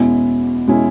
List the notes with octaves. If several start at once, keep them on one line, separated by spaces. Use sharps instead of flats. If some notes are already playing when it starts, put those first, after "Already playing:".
Already playing: E2 B2 G#3 C#4 E4
B2 G#3 C#4 E4